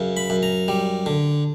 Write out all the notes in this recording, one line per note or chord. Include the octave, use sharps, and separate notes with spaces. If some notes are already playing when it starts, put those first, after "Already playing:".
Already playing: F#2 C#3
B5
F#2
A#5
G3
D3